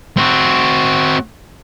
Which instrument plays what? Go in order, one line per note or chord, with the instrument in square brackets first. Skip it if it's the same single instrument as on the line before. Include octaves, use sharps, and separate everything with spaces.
[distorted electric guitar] C4 F#4